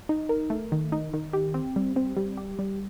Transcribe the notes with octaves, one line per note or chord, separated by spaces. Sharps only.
D#4
A#4
A3
D#3
D#4
D#3
G4
C4
G3
C4
G3
G4
G3